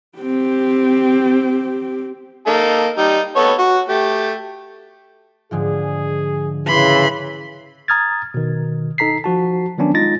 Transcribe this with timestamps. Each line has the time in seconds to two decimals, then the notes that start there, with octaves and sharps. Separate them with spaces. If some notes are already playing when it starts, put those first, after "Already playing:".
0.18 C4 G4
2.47 A#3 D#4 A4
2.97 G3 D#4
3.36 B3 A4 C#5
3.59 F#4
3.89 A3 G4
5.51 G#2 D3 F3 G#4
6.67 C#3 E3 B5 C6
7.88 A#5 D#6 F6 G#6 A6
8.34 B2 D#3
8.98 D#4 A4 A#5 B6 C7
9.24 F3 F#4 A5
9.78 D#3 F#3 B3 C#4 D4
9.94 G#3 D#4 F4 A6 A#6